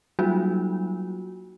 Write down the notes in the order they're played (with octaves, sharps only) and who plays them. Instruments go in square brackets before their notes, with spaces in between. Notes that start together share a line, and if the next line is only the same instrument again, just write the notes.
[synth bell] F#3 G3 A#3 D#4 F4 F#4